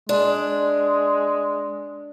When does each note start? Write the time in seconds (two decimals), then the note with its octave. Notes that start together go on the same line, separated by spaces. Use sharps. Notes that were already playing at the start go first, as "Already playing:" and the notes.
0.09 G#3 D4